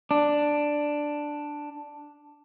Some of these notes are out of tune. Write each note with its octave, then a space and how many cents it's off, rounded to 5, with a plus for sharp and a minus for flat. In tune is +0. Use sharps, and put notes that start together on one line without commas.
D4 +5